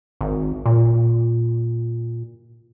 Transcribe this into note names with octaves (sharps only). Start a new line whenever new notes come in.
G#1
A#2